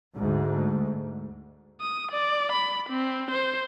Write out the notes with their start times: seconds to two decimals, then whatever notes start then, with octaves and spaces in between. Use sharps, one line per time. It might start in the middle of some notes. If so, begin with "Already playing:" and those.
0.16 D2 G#2
1.81 D#6
2.12 D5
2.52 B5
2.89 C4
3.31 C5